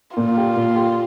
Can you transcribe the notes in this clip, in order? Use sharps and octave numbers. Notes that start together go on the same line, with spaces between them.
A#2 F4
G4
A#2
G4